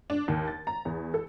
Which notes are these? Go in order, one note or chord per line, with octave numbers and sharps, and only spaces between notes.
D4
D#2
A6
A#5
E2
A4